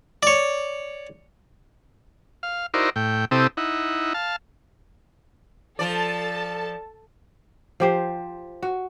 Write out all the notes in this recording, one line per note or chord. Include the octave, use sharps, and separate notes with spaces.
C#5 D5
F5
D#4 E4 F#4 A#4 C5 D5
A2 G5
C3 C4 E4 G4 A4 D#6
D#4 E4 F#5
F5 A5
F3 A4 D5 A5
F3 G4 C5
F#4